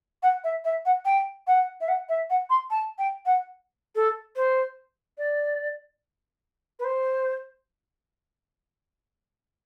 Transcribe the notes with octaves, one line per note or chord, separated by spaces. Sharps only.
F#5
E5
E5
F#5
G5
F#5
E5
F#5
E5
F#5
C6
A5
G5
F#5
A4
C5
D5
B4
C5